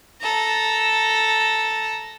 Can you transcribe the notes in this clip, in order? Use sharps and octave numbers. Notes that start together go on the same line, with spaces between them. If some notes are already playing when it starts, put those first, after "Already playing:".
A4 A#5